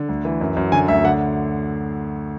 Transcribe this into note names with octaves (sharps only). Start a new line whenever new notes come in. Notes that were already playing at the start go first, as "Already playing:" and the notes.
Already playing: D3
D2
E3
F#2
F#2
D3 G#5
D2 E5
D3 F#5